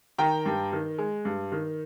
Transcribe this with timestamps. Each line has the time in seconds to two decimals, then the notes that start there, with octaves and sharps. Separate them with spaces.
0.18 D#3 G5 A#5
0.46 G2
0.73 D#3
0.98 G#3
1.25 G2
1.52 D#3